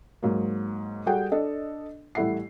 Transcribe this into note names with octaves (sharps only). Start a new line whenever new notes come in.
G#2 F#3 A#3
G3 F#4 G#4 A4 F#5 G5
D4 A4 D#5
A1 G3 A3 E4 F#5 C7